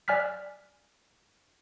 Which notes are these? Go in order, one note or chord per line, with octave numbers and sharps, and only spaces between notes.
D5 G#5 F6 F#6 B6